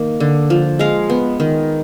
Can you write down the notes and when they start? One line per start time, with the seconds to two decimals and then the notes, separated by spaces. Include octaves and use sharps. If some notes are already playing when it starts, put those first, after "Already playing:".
Already playing: D#3 A#3
0.20 D3
0.50 F3
0.79 G#3 F5
1.10 B3
1.40 D#3